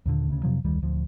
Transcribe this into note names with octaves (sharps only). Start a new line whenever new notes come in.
D#2 A#2 D3
D2 C#3
F2 C3 F3 F#3
F1 D2 D#3 G3
D1 D2 F3